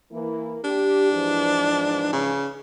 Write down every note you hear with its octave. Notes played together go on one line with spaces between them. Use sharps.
E3 A#3 E4
D4 G4
G#2 E3 F3
C#3